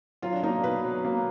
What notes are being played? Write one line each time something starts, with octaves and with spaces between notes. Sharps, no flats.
F#3 F4
D4
A#3 D#4
B2 B4
F#3
A#3